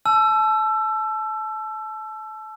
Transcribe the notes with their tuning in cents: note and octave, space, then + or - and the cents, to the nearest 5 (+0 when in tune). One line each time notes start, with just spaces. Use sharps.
A5 -30 E6 +25